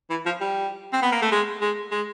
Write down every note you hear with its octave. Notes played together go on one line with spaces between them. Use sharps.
E3
F3
G3
C4
B3
A#3
A3
G#3
G#3
G#3